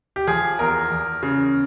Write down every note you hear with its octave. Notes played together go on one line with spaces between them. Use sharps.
G4
F3 G#4
E2 A#4
E2
C#3